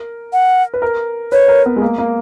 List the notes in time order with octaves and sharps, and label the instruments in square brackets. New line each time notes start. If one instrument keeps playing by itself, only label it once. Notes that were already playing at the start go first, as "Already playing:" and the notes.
Already playing: [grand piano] A#4
[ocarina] F#5
[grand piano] B4
A#4
[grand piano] B4 [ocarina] C#5
[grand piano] A#4
B3
G#3
A#3
A#3